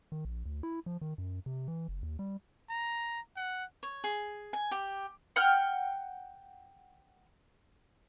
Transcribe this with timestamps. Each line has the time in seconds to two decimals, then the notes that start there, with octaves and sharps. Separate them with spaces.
0.12 D#3
0.25 A#1
0.46 D2
0.63 E4
0.86 F3
1.01 D#3
1.18 F#2
1.46 C3
1.68 E3
1.88 F#1
2.03 D#2
2.19 G3
2.70 A#5
3.36 F#5
3.83 C#5
4.04 G#4
4.53 G#5
4.71 G4
5.36 F#5 G5 F6